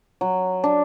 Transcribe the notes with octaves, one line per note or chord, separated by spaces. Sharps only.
F#3
D4